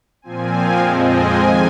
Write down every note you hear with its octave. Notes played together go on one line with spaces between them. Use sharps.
A#2 F3 C4 G#5
F5
F2 F3 G#3 C4 D#5
G#5
F2 D#3